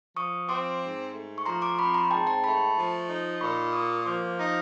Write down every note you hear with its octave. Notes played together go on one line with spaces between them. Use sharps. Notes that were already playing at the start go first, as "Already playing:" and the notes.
F3 C#6 D#6
C4 C6 D6
G#2
A3
C#6
F3 A#5 C6
C6 D6
C4 B5 C#6
A#5 C6
G#2 G5 A5
G5 A5
A3 A5 B5
F3
D#4
A#2 B5 C#6
A#3 C#6 D#6
F3 C6 D6
D#4